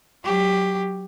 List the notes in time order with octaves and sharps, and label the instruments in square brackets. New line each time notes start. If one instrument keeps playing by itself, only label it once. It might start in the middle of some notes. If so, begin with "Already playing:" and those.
[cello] F#3 G4